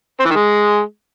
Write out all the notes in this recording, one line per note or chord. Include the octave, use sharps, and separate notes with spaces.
C4
E3
D#3
G#3